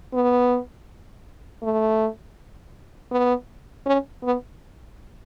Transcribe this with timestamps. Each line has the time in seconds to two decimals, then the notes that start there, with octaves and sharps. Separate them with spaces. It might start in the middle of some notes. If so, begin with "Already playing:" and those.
0.14 B3
1.63 A3
3.11 B3
3.86 C#4
4.23 B3